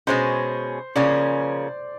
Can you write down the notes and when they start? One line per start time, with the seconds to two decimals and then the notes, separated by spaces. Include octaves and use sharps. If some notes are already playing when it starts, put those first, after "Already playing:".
0.07 B2 G#3 C#4 C5
0.96 C#3 F3 A#3 C#4 D5